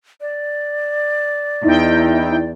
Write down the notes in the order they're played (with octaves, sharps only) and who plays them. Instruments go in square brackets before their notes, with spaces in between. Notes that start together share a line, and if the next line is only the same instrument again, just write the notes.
[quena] D5
[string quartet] E2 [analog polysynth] D#4 E4 G5